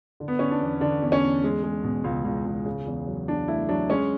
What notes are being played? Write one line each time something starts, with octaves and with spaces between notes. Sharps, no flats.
D3
B3
D3 C#4
D4
E2
D3 D4
E2
C#4
E2
G#3
G#3
B2
C#2
C#2
C#2
C#3
E2
F#3
E2 D4
A3 E4
F#3 D4
G#3 C#4